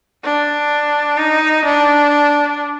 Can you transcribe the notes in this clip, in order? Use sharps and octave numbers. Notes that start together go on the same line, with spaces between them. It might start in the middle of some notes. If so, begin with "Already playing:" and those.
D4
D#4
D4